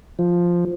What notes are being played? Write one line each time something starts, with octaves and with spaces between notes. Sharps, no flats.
F3